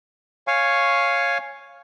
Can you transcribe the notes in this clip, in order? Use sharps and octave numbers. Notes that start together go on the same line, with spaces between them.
C#5 F5 G#5 C#6